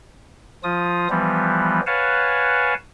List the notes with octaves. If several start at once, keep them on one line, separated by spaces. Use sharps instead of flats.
F3 F4 D#6
E3 F3 G3 B3
B4 C#5 F5 F#5 G#5 A5